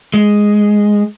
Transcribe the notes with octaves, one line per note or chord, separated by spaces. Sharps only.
G#3